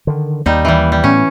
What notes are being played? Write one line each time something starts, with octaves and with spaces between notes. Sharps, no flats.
D3 D#3
D#2 G3 A#3 D#4
E3 G3
G3
A2 B3 C#4